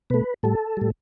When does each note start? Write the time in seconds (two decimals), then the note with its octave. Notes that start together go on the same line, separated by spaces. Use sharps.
0.10 B2 A3 B4
0.43 A2 G3 A4
0.77 A2 G3